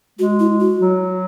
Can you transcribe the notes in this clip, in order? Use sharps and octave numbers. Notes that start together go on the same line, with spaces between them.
G#3 F#4
E4
F#4
F#3